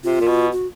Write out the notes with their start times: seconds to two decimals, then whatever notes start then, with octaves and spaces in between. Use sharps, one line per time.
0.04 C3 F4
0.20 A#2
0.28 B2
0.52 F#4